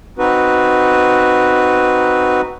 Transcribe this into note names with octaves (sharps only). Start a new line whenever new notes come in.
C4 D#4 F#4 B4